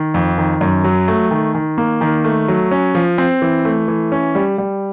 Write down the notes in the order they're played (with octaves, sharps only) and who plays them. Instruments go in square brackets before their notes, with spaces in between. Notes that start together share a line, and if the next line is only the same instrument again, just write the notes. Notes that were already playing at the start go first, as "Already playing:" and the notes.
Already playing: [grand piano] D#3
F2
D#3
F#2
F#3
A3
D#3
D#3
A#3
D#3
A3
F#3
C#4
F3
C4
E3
A3
E3
C#4
G3
G3